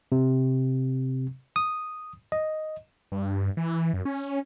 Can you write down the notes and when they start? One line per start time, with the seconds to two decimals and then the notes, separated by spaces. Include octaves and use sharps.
0.12 C3
1.56 D#6
2.32 D#5
3.12 G2
3.57 E3
3.94 F#2
4.05 C#4